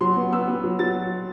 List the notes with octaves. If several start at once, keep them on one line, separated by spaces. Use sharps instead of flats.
F#3 C6
B3
B3 E6
B3
F#3
F#3 A6